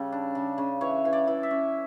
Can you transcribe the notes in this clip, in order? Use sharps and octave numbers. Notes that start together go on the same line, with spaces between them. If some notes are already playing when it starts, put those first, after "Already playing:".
Already playing: C#3 G3 A4
D4
C#3
C#3
E3 C#5
E3
D5
E3
E5
C#4